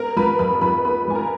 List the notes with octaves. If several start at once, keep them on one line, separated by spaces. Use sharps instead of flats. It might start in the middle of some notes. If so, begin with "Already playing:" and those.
Already playing: B3 A#4 A#5
F3 B4 B5
F2 B4 B5
F2 B4 B5
B3 B4 B5
F3 G#5
A#4 A#5